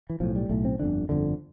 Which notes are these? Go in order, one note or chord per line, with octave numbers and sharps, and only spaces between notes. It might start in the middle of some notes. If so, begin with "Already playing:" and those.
E3
B1 A2 F3
G3
B1 A2 A3
C4
G1 F2 D3 D4
G1 F2 D3